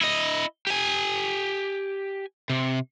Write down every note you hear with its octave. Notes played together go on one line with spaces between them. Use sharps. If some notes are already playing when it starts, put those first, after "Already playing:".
E4 D#5
G4 G#5
C3